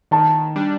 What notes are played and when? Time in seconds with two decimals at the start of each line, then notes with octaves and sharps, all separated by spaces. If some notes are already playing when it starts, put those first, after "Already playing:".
0.11 D#3 A5
0.56 G3 D4